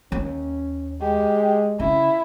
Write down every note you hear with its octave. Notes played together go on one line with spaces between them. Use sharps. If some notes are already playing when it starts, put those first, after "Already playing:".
D#2 C#4
G#3 G4
C#3 E4